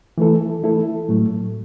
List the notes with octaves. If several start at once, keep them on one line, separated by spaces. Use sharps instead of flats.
E3 A3 E4 A4
E3 A3 E4 A4
A2 F#3 A3